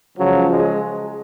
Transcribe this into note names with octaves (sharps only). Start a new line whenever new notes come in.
C#2 C#3 F3 F#3
G#3